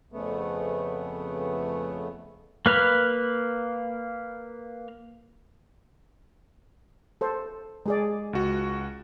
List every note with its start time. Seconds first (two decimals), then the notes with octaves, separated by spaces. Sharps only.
0.12 F2 C#3 A3 B3
2.66 A#3 B4 F6
7.21 A4 C5
7.86 G#3 G#4 D5
8.33 C#2 F#4